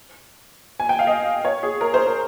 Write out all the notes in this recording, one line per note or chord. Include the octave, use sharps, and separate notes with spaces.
G#5
G5
F5
D#5
C#5
G#4
A#4
C5
A#4